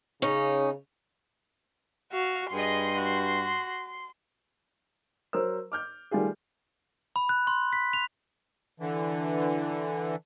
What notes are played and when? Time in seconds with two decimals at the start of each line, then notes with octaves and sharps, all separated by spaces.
0.22 C#3 C#4 D#4
2.12 F#4 F5
2.53 G2 G#4 D#5 C6
2.95 F#4
5.33 F#3 A#4 C5 E6
5.72 D6 F6 G6
6.11 D#3 G3 A3 F4 G4 G#4
7.16 B5
7.29 F#6
7.47 C6
7.73 B6
7.93 F7
8.80 D3 E3